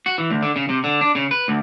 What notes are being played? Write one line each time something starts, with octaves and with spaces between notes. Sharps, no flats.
F#4
E3
D2
D3
C#3
C3
D3
D4
C#3
B4
D2